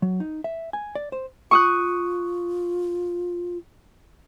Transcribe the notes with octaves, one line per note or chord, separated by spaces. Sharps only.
F#3
D#4
E5
G#5
D5
C5
F4 C#6 D#6 F#6